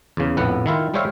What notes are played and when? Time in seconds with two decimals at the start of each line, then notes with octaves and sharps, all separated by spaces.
0.17 E2 C#3
0.37 A#1 F2 A2 B3 F#5
0.66 D#3 E4 F4
0.94 G3 G#3 C5 C#5 E5 F5